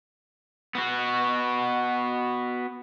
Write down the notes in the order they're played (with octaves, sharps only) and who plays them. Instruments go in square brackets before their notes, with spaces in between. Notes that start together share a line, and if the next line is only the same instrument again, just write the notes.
[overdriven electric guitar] B3 F#4